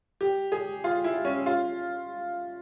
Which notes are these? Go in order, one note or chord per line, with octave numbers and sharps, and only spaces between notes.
G4
G#4
F4
E4
C#4
F4